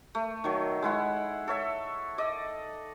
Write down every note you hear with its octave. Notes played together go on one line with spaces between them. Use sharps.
A3
D#3 F#3
G#3 E4 F#5
A4 C#5 E5
D5 D#5